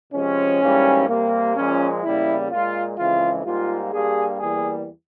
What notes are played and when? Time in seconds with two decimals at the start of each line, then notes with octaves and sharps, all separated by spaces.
0.13 C3 F3 G#3 C#4
0.61 G#2 E3 G3 A#3
1.08 C3 G3 A#3
1.56 A#2 F3 G#3 C#4
2.03 E2 C#3 G3 A#3 E4
2.51 A#2 G#3 F4
2.98 F2 C#3 E3 G#3 F4
3.45 G#2 G3 A#3 F4
3.93 G2 G3 A#3 G#4
4.40 E2 E3 G3 A#3 G#4